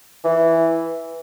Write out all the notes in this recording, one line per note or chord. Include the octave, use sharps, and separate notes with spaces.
E3